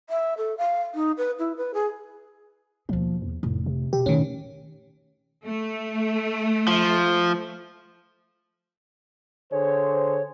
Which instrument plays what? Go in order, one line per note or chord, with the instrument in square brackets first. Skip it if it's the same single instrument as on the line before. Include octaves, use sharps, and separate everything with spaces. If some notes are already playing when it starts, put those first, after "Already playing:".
[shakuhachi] E5
A4
F5
D#4
B4
E4
B4
G#4
[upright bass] D#2 B2 [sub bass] F3
[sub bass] E2
[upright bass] F1 [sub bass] A2
[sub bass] C3
[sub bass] B2 [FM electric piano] G4
[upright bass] A2 [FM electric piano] D#3 C#4
[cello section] A3
[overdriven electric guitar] F3
[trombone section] D3 G#4 C5 [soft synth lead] C#5